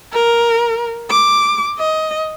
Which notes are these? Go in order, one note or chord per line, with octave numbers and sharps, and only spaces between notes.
A#4
D6
D#5